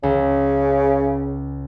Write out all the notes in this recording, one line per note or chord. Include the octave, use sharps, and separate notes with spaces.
C#2 C#3